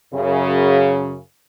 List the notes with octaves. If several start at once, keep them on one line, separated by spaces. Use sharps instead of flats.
F#2 C#3